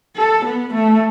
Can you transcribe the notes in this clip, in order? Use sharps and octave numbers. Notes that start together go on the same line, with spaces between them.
A4
B3
A3